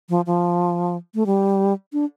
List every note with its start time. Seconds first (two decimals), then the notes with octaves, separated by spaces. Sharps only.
0.09 F3
0.26 F3
1.15 A3
1.26 G3
1.93 D4